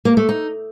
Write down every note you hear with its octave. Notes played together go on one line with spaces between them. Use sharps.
A#3
A3
D#4